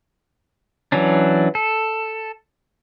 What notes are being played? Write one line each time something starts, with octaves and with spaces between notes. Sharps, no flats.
E3 F#3 C#4 D4
A4